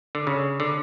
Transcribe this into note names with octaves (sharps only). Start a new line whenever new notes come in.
D3
C#3
D3